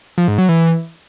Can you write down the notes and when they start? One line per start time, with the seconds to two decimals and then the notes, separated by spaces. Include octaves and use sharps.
0.18 F3
0.28 G#2
0.38 F#3
0.49 E3